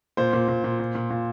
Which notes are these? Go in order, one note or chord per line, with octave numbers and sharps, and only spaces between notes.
A#2 C5
A#2
A#2
A#2
A#2
A#2
A#2